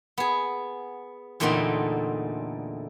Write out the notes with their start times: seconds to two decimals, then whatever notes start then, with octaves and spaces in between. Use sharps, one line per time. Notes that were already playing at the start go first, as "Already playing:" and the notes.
0.18 B3 G#4
1.40 E2 A#2 D3 A3 C4 D#4